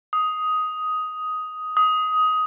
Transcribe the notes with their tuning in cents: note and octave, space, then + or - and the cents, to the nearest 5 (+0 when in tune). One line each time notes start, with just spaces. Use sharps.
D#6 +10
D#6 +15